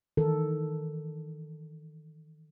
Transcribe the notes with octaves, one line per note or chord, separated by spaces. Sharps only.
D#3 E3 A4 A#4